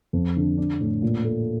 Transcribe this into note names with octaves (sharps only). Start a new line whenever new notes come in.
F2
D3
D4
A2
A#2
A3